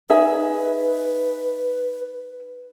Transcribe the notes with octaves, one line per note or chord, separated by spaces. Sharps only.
D#4 G#4 B4 E5